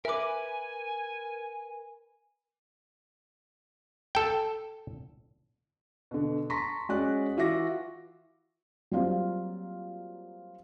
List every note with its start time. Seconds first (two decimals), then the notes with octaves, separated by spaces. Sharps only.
0.05 A#4 B4 E5 G#5 D6
4.15 A4 G5
6.11 B2 D3
6.50 A5 A#5 C6 C#6 A#6 B6
6.89 G#3 C#4 F#4 D5 F#6
7.37 E3 F4 F#4 E5 D6 A#6
8.91 F#3 G3 A#3 C4 F4 F5